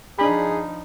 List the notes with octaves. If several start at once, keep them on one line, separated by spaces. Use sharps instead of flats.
F3 D4 D#4 G#4 B5